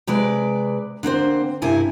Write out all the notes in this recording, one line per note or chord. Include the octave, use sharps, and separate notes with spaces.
C3 G#3 B4 D5
D3 A#3 C4 C5
G2 C3 E4 A#4 G#5